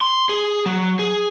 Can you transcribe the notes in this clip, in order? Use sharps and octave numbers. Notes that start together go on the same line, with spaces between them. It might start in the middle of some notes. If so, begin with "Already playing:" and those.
C6
G#4
F#3
G#4